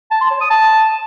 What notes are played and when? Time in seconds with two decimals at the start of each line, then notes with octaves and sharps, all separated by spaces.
0.11 A5
0.21 C6
0.31 C#5
0.41 D#6
0.50 A5